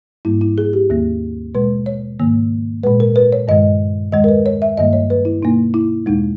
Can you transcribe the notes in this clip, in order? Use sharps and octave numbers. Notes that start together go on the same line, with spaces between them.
G#2 G3 A#3 E4
E4
G#4
G4
D#2 D#3 A#3
B2 G#3 B4
C#5
G#2 D#3 A#3
A#2 G#3 B4
A#4
B4
C#5
G2 D#3 G#3 D#5
E2 D#3 G#3 D#5
A#4
B4
C#5
E5
G2 D#3 G3 A#3 D#5
C#5
B4
E4
B2 A#3 D#4
E4
E2 B2 G#3 D#4